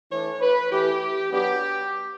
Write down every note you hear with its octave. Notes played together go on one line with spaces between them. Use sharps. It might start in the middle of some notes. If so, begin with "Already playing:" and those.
E3 A3 D4 C#5
B4
E3 A3 E4 G4
F#3 B3 D4 G4